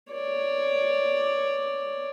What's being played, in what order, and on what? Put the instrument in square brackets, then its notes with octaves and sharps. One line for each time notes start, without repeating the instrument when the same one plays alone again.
[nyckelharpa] C#5 D5